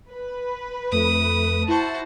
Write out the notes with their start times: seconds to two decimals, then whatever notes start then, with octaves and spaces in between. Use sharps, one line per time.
0.10 B4
0.92 F2 A3 D#6
1.68 E4 F#4 C5 A5